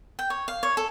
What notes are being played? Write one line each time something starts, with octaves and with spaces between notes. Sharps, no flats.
G5
C#5
F5
C#5
A4